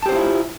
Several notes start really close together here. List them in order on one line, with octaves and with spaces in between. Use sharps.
A5 G4 C5 F4 E4